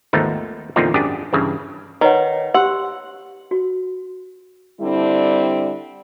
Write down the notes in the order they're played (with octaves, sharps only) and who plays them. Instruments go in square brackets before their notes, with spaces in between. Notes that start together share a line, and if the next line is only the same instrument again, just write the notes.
[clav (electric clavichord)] G#1 D#2 F3 A3 B3 D#4
E2 A#2 D3 F3 C4 D#4
G#1 F#2 D4 G4 G#4
G2 C#3 E3
[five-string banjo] D#3 [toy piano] B4 C#5 F#5
[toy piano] G4 C6 E6 [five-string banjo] F#5
[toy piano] F#4
[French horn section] D3 G3 C4 D4 E4